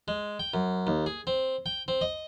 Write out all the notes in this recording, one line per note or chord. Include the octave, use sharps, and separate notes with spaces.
G#3
G5
F#2
D#2
G#4
C4
G5
C4
D#5